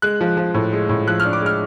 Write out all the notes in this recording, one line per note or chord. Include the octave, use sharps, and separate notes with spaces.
G#3 F#6
F3
F3
A2
G#3
A2
F3 F#6
F6
D4
D6
G#3 F6